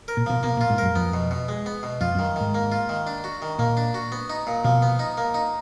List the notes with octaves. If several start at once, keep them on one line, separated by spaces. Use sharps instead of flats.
A#4
A#2
B2 F3
B2 A#3
A#2
F4
G#2
F#2 A#4
F2 B3
B2
B2
G#3
B3
B2
F2 F4
F#2
D#3
G#2 D#3
A#3
F4
D#3
D4
F#4
D#3
A#2 A#3
D4
F#4
B3
D#4
A#2
B2 F3
B3
D#4
A#3
D#4